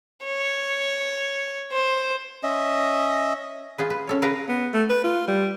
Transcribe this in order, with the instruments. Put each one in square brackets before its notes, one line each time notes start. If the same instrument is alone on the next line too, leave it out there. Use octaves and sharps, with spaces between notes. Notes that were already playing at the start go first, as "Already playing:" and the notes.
[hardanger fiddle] C#5
C5
[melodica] C#4 D#5 E5
[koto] F4 G#4 B4
B4
C#4 A4 C#5
C#3 A#4 B4 F5 A#5
[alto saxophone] B3
A3
B4
F4
G3